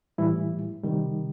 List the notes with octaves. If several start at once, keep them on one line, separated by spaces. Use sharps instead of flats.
A2 E3 G3 E4
C3 D#3 G3